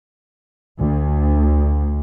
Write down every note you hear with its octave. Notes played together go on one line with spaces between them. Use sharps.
D2